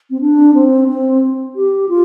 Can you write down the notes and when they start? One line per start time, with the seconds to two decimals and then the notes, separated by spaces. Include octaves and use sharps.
0.10 C4
0.20 D4
0.54 C4
0.88 C4
1.55 G4
1.88 F4